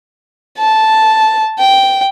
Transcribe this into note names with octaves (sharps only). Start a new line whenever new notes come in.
A5
G5